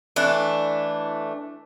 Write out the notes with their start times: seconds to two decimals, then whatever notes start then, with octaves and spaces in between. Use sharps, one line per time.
0.16 E3 A3 D4